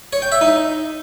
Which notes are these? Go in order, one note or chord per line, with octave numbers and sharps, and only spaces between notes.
C#5
G5
E5
D#4